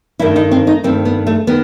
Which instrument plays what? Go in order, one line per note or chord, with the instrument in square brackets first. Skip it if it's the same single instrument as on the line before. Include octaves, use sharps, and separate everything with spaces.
[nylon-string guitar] G2 D#3 A3 E4
D#4
C4
D#4
G2 D#3 A3 C4
B3
A3
D#3 B3